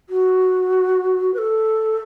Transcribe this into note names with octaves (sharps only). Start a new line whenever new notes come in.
F#4
B4
A4